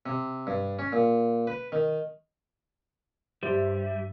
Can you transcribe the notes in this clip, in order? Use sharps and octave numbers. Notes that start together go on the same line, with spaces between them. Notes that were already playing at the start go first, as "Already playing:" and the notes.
C3
G2
C#4
A#2
B4
D#3
G2 G3 G4 C5 E5